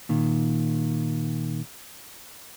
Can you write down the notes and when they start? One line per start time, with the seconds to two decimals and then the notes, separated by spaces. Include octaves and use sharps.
0.09 A#2 D#3